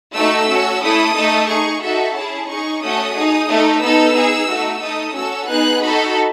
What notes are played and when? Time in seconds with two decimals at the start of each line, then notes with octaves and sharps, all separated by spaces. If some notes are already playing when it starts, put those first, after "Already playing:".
0.15 A3 D#4 F#4 A4 E6
0.49 C#4 F#4 A4
0.82 A3 E4 A4 D#6
1.16 A3 D#4 A4
1.49 D#4 G#4 C#6
1.82 D#4 F#4 A4 E5
2.15 C#4 E4 G#4 A5
2.49 D#4 G#4 C#6
2.82 A3 C#4 F#4 A4 D#6
3.15 D#4 G#4
3.49 A3 D#4 A4
3.82 B3 D#4 A4 E6
4.15 D#4 G#4
4.49 A3 D#4 F#4
4.82 A3 D#4 A4 D#6
5.15 C#4 F#4 A4 E6
5.48 B3 D#4 G#4 F#6
5.82 D#4 F#4 A4 B5